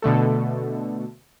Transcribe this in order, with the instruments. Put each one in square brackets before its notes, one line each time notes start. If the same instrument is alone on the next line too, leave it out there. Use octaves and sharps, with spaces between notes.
[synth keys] B2 D3 A3 A4